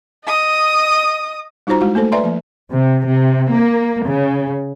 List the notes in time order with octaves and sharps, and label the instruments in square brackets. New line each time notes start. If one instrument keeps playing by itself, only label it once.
[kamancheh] D#5 D#6
[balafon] G3 D#4 F4 F#4 C5 A#5
G#3 E4 F#4
A3 A#3 A4 C5
B4 D5 E5 G#5 A#5 C6
F3 A#3
[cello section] C3
C3
A#3
C#3